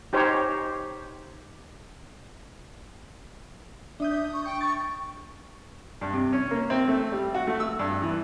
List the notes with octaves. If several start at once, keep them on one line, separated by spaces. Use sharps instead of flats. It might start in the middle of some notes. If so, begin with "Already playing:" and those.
D#4 G4 C5 C#5
D4 E5 D#6 G6
C#6
G5 C#6
C#6 A6
G2
C3
C#4
A#3
C4
A3
G3
F#4
A3
E6
G2
E3